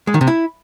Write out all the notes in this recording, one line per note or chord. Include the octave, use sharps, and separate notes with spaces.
G#3
D#3
C3
E4